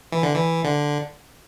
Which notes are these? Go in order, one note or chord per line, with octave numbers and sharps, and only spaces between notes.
E3
D3
E3
D3